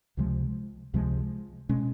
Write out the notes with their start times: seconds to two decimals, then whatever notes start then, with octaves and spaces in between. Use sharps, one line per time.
0.17 C#2 C3 F3 G#3
0.93 C#2 C3 F3 G#3
1.69 B2 G#3 C#4